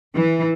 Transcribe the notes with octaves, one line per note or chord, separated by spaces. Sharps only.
E3